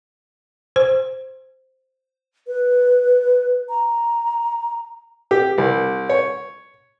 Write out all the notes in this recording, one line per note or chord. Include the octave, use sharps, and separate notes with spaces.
C5
B4
A#5
G4
C2
C#5